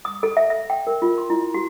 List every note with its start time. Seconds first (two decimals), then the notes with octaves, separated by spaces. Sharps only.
0.05 D#6
0.23 A4
0.37 E5
0.50 E5
0.70 G5
0.87 A#4
1.02 F4
1.18 C6
1.30 E4
1.54 F#4